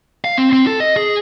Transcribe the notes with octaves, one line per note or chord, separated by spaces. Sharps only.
F5
C4
C4
A4
D#5
G#4